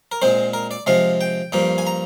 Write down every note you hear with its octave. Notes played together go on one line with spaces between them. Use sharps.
A#4
A#2 G#3 C4 C5
A#4
D5
C3 F3 G#3 F5
G5
G2 F3 A#3
G#5
A#5